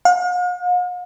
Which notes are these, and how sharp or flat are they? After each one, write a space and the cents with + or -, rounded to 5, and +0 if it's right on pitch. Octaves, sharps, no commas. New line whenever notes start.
F5 +45